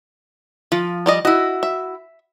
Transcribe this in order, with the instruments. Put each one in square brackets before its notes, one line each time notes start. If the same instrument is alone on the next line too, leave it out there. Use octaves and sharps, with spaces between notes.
[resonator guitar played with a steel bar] F3 [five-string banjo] F4
[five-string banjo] G3 D5 D#5
[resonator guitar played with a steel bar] E4 F#4 [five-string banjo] D#5
[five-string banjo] E5